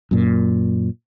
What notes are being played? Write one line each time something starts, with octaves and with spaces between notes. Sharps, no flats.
F#2 A#2